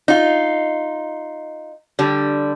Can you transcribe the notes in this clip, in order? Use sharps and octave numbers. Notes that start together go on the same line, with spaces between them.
D#4 F4
D3 G3